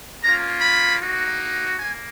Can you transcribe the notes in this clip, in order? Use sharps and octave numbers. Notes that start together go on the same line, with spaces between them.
A#3 C#4 F4 A#5
B5
A#3 D#4 F#4
A#3 G#5